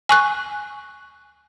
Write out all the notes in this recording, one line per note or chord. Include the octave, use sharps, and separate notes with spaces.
G#5 C#6 F#6